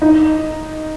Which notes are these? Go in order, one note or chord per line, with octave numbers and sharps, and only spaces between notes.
D#4